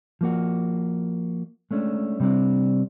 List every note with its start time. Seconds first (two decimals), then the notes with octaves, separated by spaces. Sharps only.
0.21 F3 A#3 F#4
1.71 G#3 A3 C#4 D4
2.20 C3 G3 B3 C4 D4